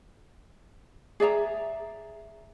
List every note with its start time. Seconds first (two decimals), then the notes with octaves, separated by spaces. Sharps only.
1.20 G#4 D5 E5 A#5